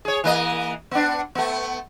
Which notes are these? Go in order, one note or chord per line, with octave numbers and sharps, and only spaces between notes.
G#4 C#5
E3 A#3 D#5
B3 D4
A3 B3